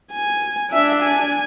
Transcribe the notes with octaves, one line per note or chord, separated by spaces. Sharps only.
G#5
D4 E5
G#5